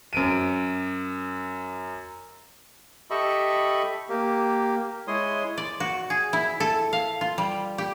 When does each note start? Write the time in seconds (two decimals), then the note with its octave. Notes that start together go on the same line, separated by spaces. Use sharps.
0.13 F#2 D7 D#7
3.10 G4 A4 D#5 E5 B5 C#6
4.09 A#3 G4
5.08 G#3 E4 C#5 C6 D#6
5.58 D5
5.80 F#4
6.10 G#4
6.33 E4
6.60 A4
6.93 F5
7.21 F4
7.38 G3
7.78 G4